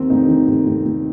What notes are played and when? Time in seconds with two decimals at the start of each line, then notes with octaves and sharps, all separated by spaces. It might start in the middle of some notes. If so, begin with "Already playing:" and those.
Already playing: D#2 D#3 C4
0.10 F1 D#4
0.28 D#3
0.48 F1
0.67 F1
0.85 F1